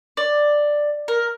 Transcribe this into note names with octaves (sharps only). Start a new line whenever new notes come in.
D5
A#4